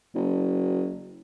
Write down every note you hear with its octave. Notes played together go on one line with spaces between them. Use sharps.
F#1